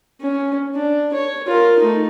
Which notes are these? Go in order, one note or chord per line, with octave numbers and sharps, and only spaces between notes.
C#4
D4
C#5
F4 A#4
A3 D#4